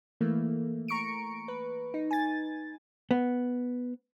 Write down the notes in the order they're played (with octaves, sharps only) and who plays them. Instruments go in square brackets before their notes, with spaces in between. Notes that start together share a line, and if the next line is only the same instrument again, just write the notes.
[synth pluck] E3 A3 A#3
A#5 C#6 C#7 D7
B4
D#4
G#5 A6
[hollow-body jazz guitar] B3